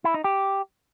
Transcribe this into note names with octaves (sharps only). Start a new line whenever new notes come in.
E4
D#4
G4